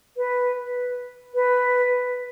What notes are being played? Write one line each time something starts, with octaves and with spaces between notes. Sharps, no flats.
B4
B4